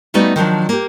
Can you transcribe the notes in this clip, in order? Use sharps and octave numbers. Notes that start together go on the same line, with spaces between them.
G3 A3 B3 D#4 F#4
D#3 F3 F#3 D4
A#3 G4